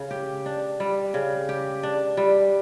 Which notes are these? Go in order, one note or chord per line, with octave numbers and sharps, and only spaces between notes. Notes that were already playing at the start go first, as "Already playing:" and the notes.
Already playing: C#3
G4
D4
G3
C#3
G4
D4
G3